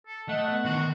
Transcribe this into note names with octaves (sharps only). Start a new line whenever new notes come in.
A4
A3 D#5 F#5
B3
D3 D#3 F#4